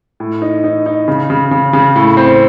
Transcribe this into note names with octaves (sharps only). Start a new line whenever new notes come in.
A2
D#4
D#4
D#4
C#3
C#3
C#3
C#3
A2
C4